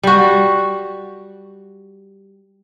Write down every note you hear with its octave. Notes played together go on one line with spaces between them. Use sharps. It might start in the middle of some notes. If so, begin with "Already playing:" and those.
G3 F#4